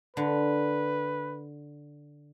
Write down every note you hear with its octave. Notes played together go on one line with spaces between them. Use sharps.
D3 B4